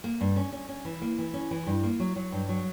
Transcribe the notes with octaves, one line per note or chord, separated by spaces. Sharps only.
A#3
G2
C#4
C#4
C#4
E3
A#3
E3
C#4
E3
G2
A#3
F#3
F#3
G2
F#3